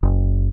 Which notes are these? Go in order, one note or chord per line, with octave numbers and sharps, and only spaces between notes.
F#1